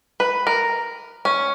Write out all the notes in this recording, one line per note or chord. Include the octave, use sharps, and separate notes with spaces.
B4
A#4
C#4